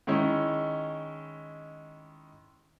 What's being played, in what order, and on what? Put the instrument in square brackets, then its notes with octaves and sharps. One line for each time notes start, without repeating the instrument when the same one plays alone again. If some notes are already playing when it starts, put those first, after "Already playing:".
[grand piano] D#3 G#3 C#4 E4